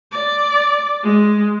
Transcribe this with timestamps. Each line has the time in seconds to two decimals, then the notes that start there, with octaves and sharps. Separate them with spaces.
0.12 D5
1.03 G#3